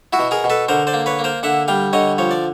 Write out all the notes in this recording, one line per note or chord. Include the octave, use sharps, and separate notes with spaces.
E4 F#4
B2
G#4 A#4
B2
A4 B4
D3 A#4 C5
C5 D5
A#3
B4 C#5
A#3
A#4 C5
D3 E5 F#5
G3 F5 G5
D3 C#5 D#5
F3 C#5
D5